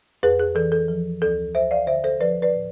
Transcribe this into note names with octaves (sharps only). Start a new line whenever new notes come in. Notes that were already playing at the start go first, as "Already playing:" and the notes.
F2 G#4 B4
G#4
E3 A4
A4
F3
D2 A4
D2 C5 E5
D5 F5
D3 C5 E5
A4 C5
F3 B4 D5
B4 D5
A2